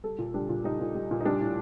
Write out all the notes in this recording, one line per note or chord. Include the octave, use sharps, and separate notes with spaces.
G3 A4
A#2
G3 D4
A#2
G3 D#4
A#2
G3
A#2
D#4
G3 D4
A2